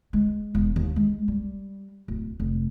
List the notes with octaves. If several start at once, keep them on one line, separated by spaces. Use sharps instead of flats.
G#3
E1
D#2
G#3
G3
D1
F1